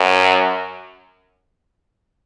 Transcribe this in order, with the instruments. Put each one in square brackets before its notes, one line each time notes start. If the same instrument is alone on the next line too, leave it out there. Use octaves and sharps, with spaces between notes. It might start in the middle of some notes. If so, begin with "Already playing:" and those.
Already playing: [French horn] F#2